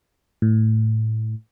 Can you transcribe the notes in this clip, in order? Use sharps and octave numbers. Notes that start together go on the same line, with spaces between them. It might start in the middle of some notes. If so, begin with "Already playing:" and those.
A2